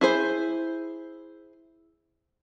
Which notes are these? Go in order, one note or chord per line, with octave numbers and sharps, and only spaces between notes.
E4 G#4 C5